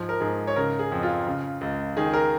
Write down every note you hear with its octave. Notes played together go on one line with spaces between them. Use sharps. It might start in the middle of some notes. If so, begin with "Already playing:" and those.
Already playing: G#2 F3
A#4
G#2 G#4
C#5
C#3 A#4
G#4
F2
F4
C#3
C#2
D#3 G#4
A#4